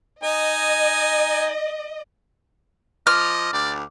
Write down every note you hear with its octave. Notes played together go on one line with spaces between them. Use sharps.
D#4 D#5 G#5
F3 D#5 D6 F6
D2 D5 D6